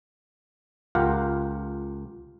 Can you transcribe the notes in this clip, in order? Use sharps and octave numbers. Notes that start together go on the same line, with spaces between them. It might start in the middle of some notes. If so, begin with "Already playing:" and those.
C#2 F4 G4 A#4 F5 F#5